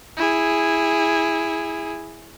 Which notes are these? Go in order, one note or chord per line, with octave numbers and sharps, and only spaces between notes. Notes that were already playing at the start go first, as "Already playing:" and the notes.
E4 G#4